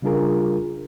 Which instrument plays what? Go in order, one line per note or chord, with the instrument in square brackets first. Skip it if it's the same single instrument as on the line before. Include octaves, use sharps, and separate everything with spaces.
[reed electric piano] C#3 G3 D4 F4 G#4 A#4